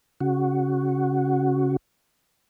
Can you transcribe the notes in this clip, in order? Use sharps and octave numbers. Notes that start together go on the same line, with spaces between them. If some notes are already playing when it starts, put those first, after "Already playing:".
C#3 F#4